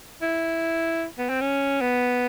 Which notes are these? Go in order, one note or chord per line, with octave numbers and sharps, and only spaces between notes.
E4
B3
C4
C#4
B3